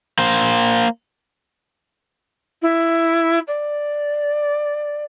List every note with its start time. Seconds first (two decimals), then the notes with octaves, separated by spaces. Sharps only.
0.19 A#3 C5
2.62 E4
3.47 D5